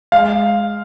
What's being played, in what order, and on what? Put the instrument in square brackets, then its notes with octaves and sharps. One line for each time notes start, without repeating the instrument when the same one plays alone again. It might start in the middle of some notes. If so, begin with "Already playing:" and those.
[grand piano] G#3 F5